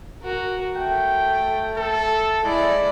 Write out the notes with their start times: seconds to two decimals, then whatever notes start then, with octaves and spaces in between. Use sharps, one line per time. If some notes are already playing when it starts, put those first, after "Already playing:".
0.21 F#4 A#4
0.76 A3 G5
1.77 A4
2.44 G#3 E4 D5